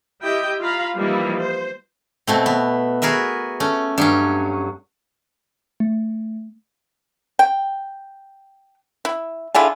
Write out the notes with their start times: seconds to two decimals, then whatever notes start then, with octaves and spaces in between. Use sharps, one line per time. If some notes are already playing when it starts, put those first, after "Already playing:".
0.22 E4 G4 D#5 G5
0.59 F4 F5 A#5 B5
0.96 E3 F3 G3 A#3 D#4 E4
1.39 C5
2.27 B2 A3 C4
2.46 B3
3.02 F#4 G#4 A#4 B4 E5
3.60 A3 C#4
3.98 G2 F#3 C#4
5.80 A3
7.39 G5
9.05 E4
9.55 D3 E4 F4 G#4